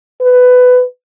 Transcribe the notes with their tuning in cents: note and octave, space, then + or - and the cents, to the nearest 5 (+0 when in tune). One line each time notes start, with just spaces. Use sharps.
B4 +15